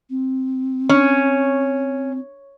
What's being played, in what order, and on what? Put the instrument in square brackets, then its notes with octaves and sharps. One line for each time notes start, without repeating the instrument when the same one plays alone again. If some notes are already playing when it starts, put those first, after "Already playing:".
[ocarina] C4
[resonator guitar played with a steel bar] C#4